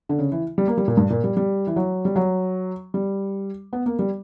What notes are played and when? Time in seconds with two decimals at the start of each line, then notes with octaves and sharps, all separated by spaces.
0.09 D3
0.19 C#3
0.32 E3
0.58 G3
0.68 A#3
0.78 G3
0.88 A#2
0.97 G2
1.10 A#2
1.24 G3
1.37 G3
1.67 E3
1.76 F#3
2.05 G3
2.16 F#3
2.94 G3
3.73 B3
3.86 A#3
3.99 G3